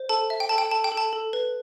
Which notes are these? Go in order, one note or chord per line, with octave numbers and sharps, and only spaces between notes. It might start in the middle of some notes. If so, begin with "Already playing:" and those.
Already playing: C5
A4 A5
E5
G5
A4 A5
G5
A4 A5
G5
A4
A5
A4
B4